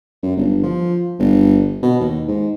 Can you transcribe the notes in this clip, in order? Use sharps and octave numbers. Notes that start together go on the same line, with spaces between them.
F#2
G1
F3
G1
B2
D#2
G#2